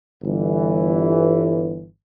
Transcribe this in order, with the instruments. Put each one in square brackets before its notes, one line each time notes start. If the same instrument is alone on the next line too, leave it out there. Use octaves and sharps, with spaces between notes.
[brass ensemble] G1 E3